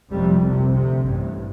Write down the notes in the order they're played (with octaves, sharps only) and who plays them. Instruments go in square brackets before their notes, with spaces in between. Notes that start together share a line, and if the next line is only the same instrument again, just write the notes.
[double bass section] F1 F2 C3 G3
C2 C3
D2 C3
A1 G2